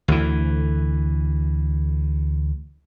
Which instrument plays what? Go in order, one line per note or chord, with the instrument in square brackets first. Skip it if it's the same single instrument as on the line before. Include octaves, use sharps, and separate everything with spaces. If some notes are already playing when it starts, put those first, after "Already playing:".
[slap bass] D2 E3